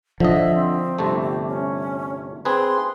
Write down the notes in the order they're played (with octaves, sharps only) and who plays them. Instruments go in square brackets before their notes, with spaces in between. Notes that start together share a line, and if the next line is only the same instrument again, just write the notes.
[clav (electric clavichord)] D3 D#5 [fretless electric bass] F3 [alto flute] E5
[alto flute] C4
[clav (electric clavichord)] G1 C3 A3
[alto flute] G4
C#4
[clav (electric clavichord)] C4 G#4 B4 [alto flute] C6